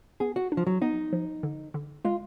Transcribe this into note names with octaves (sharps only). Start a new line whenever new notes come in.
B3 G#4
F#4
D4
F3
F#3
B3 D#4
F3
D3
D3
G#3 F4